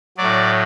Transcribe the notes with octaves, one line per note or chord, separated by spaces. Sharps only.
A2 F#3 D5